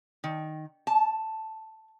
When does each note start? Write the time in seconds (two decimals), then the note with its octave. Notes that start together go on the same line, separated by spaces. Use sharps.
0.24 D#3
0.87 A5